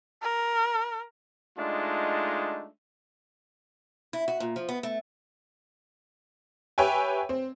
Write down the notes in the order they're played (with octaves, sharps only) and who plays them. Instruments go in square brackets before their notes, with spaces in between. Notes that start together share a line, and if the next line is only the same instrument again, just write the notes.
[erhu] A#4
[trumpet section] G#3 A3 D4 D#4 F4
[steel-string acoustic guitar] E4
F#4
A#2
F3
B3
A3
[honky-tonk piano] G4 B4 C#5 E5 G5 G#5
C4